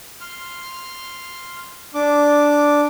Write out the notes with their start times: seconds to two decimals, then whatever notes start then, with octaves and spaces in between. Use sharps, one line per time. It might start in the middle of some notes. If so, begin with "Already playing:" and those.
0.21 C6 F6
1.94 D4 D6